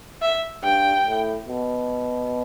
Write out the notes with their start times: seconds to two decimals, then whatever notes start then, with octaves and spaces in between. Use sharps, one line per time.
0.22 E5
0.64 G2 G5
1.05 A2
1.48 B2